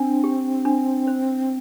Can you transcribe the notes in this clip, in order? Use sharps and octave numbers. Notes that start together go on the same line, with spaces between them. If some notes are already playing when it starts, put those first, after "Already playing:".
Already playing: C4 D4
G4
D4
C5